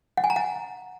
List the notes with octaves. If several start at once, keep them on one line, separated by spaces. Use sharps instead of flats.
F#5
G#5
A#5
F#5